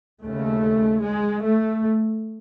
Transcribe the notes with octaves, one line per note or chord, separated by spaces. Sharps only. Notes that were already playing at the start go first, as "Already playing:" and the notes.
D#2 C#3 A3
G#3
A3